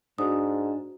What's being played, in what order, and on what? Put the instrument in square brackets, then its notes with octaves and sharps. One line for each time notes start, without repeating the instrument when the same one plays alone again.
[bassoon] G#2 [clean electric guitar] D4 [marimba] F#4 D#6